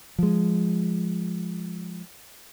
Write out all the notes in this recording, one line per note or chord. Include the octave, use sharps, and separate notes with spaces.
F3 G#3